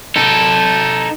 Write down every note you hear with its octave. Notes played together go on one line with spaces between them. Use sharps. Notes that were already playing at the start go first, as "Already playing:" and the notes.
D#4 A4